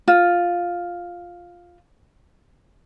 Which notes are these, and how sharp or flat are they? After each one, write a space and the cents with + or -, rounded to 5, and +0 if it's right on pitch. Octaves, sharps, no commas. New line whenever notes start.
F4 +5